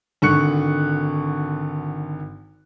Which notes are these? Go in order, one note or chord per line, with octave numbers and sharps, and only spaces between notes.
G#1 D3 C#6 F#6 C#7